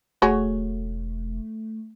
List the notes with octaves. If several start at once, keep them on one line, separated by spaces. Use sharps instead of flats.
E1 A3 F#4 G#4 C#5